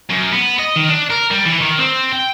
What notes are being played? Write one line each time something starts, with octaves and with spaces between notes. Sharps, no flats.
F#2
B3
D#5
D#3
D4
A#4
G3
E3
D#3
C4
G5